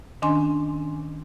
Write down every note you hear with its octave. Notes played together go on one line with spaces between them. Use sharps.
D#3 C#4 D4 G#5 C6